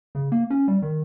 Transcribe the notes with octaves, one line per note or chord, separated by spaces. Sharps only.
C#3
A#3
C#4
G3
D#3